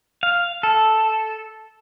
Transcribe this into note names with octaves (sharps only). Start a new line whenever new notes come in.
F5
A4